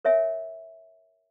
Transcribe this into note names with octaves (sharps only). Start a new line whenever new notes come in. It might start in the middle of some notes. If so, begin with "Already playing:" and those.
A#4 C#5 E5 G#5